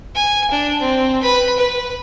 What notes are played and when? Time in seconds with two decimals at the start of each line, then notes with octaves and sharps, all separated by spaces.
0.15 G#5
0.51 D4
0.81 C4
1.22 B4 B5
1.58 B4